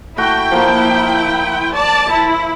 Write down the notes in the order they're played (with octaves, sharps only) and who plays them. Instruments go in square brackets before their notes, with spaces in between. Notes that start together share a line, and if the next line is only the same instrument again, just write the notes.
[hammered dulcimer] A3 F#4 [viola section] E4 G5
[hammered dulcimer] F3 A#3
[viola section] D5 A5
E4